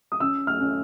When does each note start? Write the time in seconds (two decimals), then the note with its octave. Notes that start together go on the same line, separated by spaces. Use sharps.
0.12 D#6
0.20 C#4 E6
0.47 F6
0.60 C#4